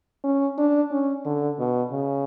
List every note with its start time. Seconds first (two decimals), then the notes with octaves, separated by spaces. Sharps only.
0.24 C#4
0.58 D4
0.92 C#4
1.26 D3
1.59 B2
1.92 C#3